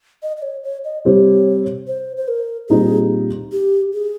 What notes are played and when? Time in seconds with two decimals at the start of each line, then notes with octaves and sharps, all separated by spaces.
0.23 D#5
0.37 D#5
0.42 C#5
0.64 C#5
0.84 D#5
1.05 C3 G3 C4 G4 C#5
1.87 C5
2.17 C5
2.28 A#4
2.69 A#2 G3 C4 D#4 G#4
3.52 G4
3.93 G#4